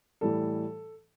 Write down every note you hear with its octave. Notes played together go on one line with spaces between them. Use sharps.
A2 E3 G3 A4